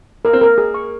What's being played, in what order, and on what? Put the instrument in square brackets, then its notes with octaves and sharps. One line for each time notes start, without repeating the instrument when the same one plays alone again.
[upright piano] A#3 [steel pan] A#4
[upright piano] C4
[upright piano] A#3 [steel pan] A#4
[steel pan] G#4
C#6